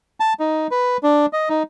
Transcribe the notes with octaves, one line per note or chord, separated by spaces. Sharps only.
A5
D#4
B4
D4
D#5
D#4